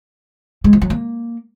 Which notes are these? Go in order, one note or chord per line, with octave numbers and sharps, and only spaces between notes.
G#3
F3
F#3
A#3